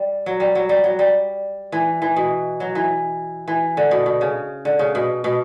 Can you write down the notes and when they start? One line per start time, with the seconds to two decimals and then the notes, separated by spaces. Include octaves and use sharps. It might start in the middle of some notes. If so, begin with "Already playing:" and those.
Already playing: G3
0.26 F#3
0.40 G3
0.55 F#3
0.69 G3
0.84 F#3
0.99 G3
1.72 E3
2.02 E3
2.16 B2
2.60 F#3
2.75 E3
3.48 E3
3.77 D3
3.91 B2
4.06 B2
4.21 C#3
4.65 D3
4.79 C#3
4.95 B2
5.24 B2